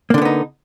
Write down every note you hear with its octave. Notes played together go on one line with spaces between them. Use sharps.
D3 A#3 B3 D4 D#4